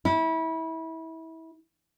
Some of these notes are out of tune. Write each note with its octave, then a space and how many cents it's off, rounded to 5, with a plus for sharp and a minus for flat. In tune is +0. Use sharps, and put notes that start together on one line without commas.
E4 -25